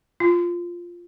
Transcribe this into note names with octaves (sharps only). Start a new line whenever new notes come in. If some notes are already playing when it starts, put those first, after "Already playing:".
F4